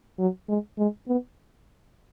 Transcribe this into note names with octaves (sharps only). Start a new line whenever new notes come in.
F#3
G#3
G#3
B3